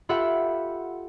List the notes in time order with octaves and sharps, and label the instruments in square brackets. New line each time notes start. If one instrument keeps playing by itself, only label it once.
[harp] F4 G4 A4 E5 F#5 B5